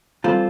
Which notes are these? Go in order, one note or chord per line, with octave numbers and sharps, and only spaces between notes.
E3 G3 C4 F4 A4